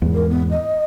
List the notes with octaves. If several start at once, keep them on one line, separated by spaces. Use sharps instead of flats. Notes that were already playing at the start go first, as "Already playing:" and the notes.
E2 G#2
A#4
B3
D#5